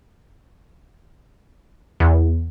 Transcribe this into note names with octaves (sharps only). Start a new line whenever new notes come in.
E2